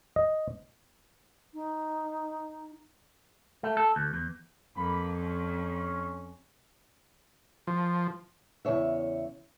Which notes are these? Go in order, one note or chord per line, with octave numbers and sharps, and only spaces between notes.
D#5
D#4
A3
A4
D2
E2
F2 A#3 B5
C#4
F3
E2 C#3 C#5 E5